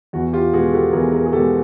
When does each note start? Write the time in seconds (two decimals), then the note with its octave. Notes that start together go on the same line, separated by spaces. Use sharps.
0.13 E2 F#4
0.33 F4 G4
0.53 B2 G#3 F#4 G#4
0.73 G4 A4
0.93 E2 G#4 A#4
1.12 G#4 A#4
1.26 G#4
1.32 B2 G4 A4
1.36 G#3